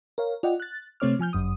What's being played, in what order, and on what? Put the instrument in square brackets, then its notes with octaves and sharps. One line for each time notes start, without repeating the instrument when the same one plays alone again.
[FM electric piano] A#4 C#5 F5
F4 D5 D#5 F#5 G5
F#6 A6
C3 A3 C4 C#5 D6 F6
F3 G#5 F6 G6
G1 F#2 D#6